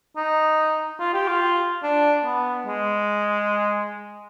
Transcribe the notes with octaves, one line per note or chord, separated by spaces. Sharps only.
D#4
F4
G4
F4
D4
B3
G#3